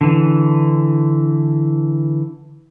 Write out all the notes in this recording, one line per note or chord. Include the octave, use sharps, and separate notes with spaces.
D3 E3